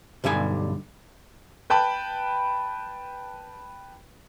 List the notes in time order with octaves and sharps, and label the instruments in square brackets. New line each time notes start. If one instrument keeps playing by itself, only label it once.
[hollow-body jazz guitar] B1 G2 D3 G3 G#5
[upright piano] B4 G5 A5 B5